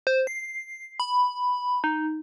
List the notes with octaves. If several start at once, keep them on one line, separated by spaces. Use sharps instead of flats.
C5
C7
B5
D#4